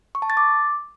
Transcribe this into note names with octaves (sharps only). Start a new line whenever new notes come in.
C#6
A5
A6
D6